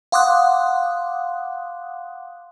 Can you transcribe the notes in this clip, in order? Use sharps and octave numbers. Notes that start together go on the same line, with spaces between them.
F5 F#5 C6 D6 D#6 F#6